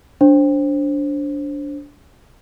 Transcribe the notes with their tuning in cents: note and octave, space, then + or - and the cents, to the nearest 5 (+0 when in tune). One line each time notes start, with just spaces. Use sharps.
D4 -20 C5 +15